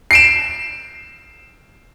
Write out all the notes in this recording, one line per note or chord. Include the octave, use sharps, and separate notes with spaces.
C7 D7 E7